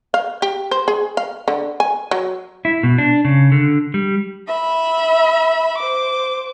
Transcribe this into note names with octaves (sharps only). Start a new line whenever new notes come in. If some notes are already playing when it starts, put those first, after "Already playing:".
F5
G4
C5
G#4
F5
D3
G#5
F#3
E4
B2
D4
C#3
D3
G3
E5 B5
C5 D6